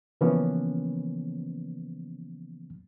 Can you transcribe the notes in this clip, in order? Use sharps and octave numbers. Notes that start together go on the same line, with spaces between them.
C#3 E3 F3 A#3 B3 C#4